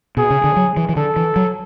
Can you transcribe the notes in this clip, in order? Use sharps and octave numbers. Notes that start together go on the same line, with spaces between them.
B2 G#4
C#3
D3
F#3
E3
E3
D3 A4
E3
F#3